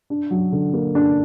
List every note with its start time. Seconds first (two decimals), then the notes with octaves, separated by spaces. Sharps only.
0.10 D4
0.30 F#3
0.52 D3
0.74 A#3
0.95 D4